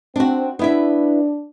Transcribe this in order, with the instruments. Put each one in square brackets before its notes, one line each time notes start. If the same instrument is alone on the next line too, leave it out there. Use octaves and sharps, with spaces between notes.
[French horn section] C4 [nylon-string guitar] D4 F#4
[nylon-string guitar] B3 E4 E5 [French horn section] D4